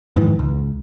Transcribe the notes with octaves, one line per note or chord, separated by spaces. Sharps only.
F2 G#2 D#3 E3
C#2